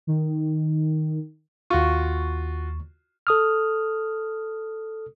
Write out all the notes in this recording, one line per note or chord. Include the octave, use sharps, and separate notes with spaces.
D#3
D#2 F4 F#4 C#6
A4 D#6 F6